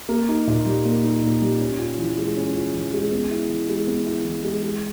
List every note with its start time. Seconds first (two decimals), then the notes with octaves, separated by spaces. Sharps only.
0.09 A#3
0.29 D#4
0.48 A#2
0.66 G3
0.85 A#3
1.04 D#4
1.23 A#2
1.42 G3
1.60 C#4
1.79 F4
1.99 E3
2.17 G#3
2.37 C#4
2.55 F4
2.74 E3
2.93 G#3
3.12 B3
3.30 E4
3.49 E3
3.69 G#3
3.87 B3
4.06 E4
4.25 E3
4.44 G#3
4.63 G#3